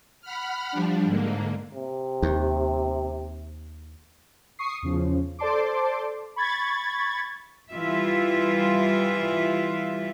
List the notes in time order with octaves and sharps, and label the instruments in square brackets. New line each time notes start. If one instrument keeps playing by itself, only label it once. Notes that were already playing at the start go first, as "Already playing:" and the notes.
[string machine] F#5 B5 F6
F3 G3 D4
G#2 D3 A#3
[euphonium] C3
[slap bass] D#2
[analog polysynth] C#6 D#6 C7
E2 C#3 F3
A4 C5 D5 A5 C6 D6
B5 C#6 G#6 A6
[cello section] E3 G3 F4 E5